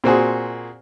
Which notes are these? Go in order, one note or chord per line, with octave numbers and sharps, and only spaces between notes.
A#2 C4 F#4 G#4